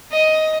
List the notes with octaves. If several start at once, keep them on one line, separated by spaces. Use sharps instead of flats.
D#5